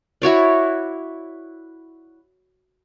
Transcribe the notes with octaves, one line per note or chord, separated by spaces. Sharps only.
E4 F#4 C#5 D5